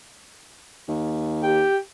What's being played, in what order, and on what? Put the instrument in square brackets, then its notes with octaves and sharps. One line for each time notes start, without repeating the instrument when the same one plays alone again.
[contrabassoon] D#2
[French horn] G4 [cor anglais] G5